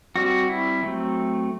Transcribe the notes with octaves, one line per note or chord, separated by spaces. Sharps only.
G3 C4 F#4
E4
F#3 A3 C4